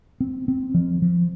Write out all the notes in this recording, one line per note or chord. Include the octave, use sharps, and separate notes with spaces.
C4
C4
F3
F3